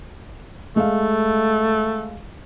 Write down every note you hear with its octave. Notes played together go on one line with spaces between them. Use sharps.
G#3 A3 F5